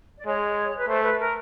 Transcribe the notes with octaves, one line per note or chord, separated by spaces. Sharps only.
D5
G#3 C#5
B4
A3 C5
B4
A#4